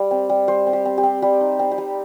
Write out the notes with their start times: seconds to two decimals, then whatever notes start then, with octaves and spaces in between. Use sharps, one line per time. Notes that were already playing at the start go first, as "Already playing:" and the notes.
Already playing: G3
0.11 C4
0.30 G3
0.48 G3 C5
0.67 C4
0.73 G4
0.85 C4
0.98 G4
1.03 C4
1.22 G3 G4
1.41 D#4
1.59 C4
1.71 G4
1.78 G3